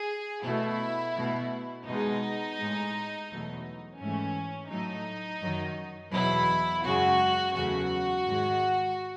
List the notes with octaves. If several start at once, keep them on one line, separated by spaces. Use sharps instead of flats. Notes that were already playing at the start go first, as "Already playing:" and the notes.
Already playing: G#4
B2 A3 E4
B2 A3
B2 G#3 D#4
A2 G#3
E2 B2 F#3 A3
G#2 E3 A3 C#4
A2 F#3 A3 D#4
F#2 D#3 F#3
E2 B2 F#3 E4
F#2 C#3 G#3 F#4
E2 C#3 F#3 A3 F#4
G#2 D#3 G#3